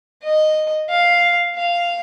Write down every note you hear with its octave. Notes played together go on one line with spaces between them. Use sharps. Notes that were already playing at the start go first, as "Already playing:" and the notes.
D#5
F5
F5